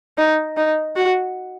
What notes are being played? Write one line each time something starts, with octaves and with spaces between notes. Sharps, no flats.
D#4
D#4
F#4